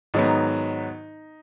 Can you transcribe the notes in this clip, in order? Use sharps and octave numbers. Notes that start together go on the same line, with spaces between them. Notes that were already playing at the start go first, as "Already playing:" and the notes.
G#2 D#3 F#3 B3 D#4